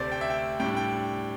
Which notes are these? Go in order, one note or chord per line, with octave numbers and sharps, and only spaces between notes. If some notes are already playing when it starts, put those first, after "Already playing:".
Already playing: D2 C3 A3 C5 D5
G5
E5
G5
A2 G3 D4 G5
G5